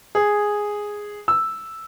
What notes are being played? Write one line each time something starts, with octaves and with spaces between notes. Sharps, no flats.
G#4
E6